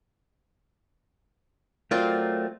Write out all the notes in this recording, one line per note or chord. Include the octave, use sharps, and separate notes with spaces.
F#3 A3 C4 F4 A#4 D5